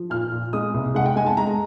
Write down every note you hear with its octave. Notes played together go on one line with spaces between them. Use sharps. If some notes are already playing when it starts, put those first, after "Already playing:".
Already playing: F3
A#2 F6
A#2
G#3 D#6
C2
G#3 F#5
G5
G#3 G#5
A5
G#3 A#5